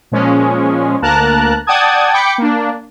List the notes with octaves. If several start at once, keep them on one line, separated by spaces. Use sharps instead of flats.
A#2 F3 G#3 C#4
D2 A#3 A#4 A5 A#5 F#6
D5 F#5 G5 A5 D#6 G#6
G5 B5 D6 C#7
A#3 D4